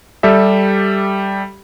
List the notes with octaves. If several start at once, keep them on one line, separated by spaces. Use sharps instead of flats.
G3 G4 A4 E5